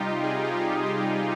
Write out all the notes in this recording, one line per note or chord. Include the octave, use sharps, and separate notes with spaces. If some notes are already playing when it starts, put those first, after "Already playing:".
Already playing: C3 G3 D#4 F4 G4
C3 G#4
G4
G3 F4
G4
C3